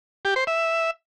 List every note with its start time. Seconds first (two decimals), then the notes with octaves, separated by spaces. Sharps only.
0.25 G4
0.36 C5
0.47 E5